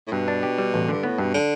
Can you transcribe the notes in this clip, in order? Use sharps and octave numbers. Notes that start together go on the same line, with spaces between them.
A2
G2 B2
D4
G4
G3
A1
G2 D3
A2 B3
G2 B2
D3